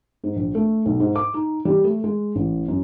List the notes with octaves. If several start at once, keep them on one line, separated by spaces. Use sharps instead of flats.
G#2
A#1
A3
B1
G#2
D6
D#4
G3
A3
G#3
A1
F#2